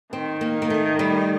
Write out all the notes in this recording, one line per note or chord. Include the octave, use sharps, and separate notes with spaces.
D#3 C4
A#3
A#3
A3
G3